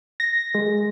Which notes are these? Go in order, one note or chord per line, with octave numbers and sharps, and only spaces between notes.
A#6
G#3